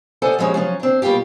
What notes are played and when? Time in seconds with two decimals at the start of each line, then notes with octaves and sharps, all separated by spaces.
0.22 A4 C5 D5 D#5 F#5 G#5
0.39 F3 G3 G#3 C#4 F#4
0.54 F3 F#3 C#4
0.80 C4 D4
1.02 B2 G3 A#3 F4 G4